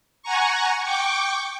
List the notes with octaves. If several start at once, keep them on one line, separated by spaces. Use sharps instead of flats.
F#5 G#5 A#5 C#6
G5 C#6 D6